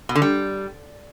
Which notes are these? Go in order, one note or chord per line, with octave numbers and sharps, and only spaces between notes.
B2
D3
G3